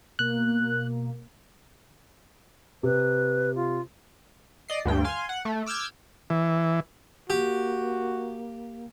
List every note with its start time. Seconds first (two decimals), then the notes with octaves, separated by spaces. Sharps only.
0.19 B2 A#3 F#6
2.83 C3 B4
3.55 F4
4.68 D5 D#5 C7
4.85 D2 G2 G5
5.04 F5 G#5 C6
5.29 F#5
5.45 A3
5.66 D6 E6 F6 G6 G#6
6.30 E3
7.30 A#3 F#4 G4